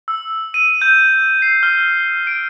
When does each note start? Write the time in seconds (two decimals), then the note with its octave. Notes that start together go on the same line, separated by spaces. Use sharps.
0.08 E6
0.54 D#7
0.82 G6
1.42 C7
1.63 F6
2.27 D7